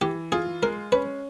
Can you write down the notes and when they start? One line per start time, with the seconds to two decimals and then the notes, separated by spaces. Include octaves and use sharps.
0.01 E3 G4
0.32 F4 G#4
0.62 G#3 A#4
0.92 C#4 B4